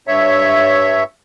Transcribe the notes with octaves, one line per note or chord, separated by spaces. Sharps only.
G2 C#5 E5